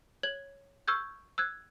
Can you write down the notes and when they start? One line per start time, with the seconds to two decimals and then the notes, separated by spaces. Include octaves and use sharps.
0.23 C#5 G#6 F#7
0.88 C#6 E6 F6 G6 G#6
1.38 E6 F#6 G#6